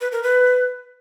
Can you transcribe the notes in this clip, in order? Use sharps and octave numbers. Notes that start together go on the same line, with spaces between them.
B4
A#4
B4